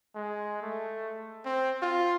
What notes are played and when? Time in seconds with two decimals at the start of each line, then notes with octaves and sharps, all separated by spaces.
0.15 G#3
0.62 A3
1.45 C4
1.82 F4